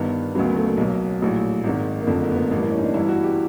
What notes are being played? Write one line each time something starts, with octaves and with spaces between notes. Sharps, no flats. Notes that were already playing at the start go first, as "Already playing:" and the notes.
Already playing: G1 G2 D#3 B3
D2 C#3 F#3 B3
A#3
A3
A#3
B1 B2 F#3
A#1 A2 F#3
G#1 G#2 D#3
A#3
F#1 F2 D3 F3 A3
A#3
B3
A#3
A1 G2 E3 A#3
A#3
C#4
D#4
D4
G1 G2 E3 E4
F#4
G4